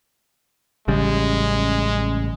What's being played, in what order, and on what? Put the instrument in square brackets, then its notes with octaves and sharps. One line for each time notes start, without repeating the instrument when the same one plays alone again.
[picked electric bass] A1 C#3 G3 [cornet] G#3